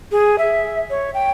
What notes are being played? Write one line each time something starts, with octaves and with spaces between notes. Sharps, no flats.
G#4
E5
C#5
G5